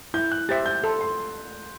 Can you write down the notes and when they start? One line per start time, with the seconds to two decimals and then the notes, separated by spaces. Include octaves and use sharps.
0.14 E4 G6
0.32 F#6
0.49 G4 C5 E5 A6
0.66 G6
0.84 A4 C6
1.01 C6